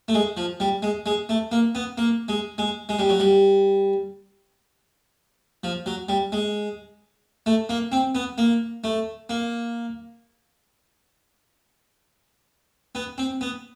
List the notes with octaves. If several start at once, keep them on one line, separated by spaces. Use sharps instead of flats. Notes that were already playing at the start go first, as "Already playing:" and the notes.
A3
G#3
F3
G3
G#3
G#3
A3
A#3
B3
A#3
G#3
G#3
G#3
G3
F#3
G3
F3
F#3
G3
G#3
A3
A#3
C4
B3
A#3
A3
A#3
B3
C4
B3